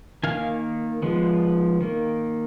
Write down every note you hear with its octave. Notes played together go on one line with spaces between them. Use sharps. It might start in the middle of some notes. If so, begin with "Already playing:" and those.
D#3 A#3 F5 G#5
F3 G#3 B3
D#3 A#3